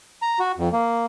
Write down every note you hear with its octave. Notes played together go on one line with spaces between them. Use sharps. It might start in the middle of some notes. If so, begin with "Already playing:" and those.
A#5
F#4
F2
A#3